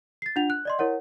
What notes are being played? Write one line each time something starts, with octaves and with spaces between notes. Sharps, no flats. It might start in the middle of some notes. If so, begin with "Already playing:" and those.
A6 C7
D4 F4 F#5 F7
F#6
D5 D#5 C6
E4 A#4 C#5 F#5